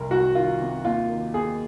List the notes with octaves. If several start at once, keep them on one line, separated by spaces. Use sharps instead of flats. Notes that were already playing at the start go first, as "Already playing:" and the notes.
Already playing: F1 C2 A#4
C2 F#4
D#3 F4
C3
D#2 F4
D#3
D#2 G#4